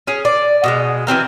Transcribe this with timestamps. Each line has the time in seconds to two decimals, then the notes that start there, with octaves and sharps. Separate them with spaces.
0.07 C#4 G#4
0.25 D5
0.64 B2 E3 G#3
1.07 E3 F#3 C4 A#4